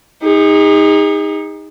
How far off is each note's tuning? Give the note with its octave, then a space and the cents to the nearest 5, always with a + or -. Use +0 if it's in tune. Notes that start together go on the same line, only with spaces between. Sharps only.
D#4 +15 G#4 -40